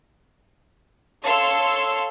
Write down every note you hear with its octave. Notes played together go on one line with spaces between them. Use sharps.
A4 C#5 F5 C6 E6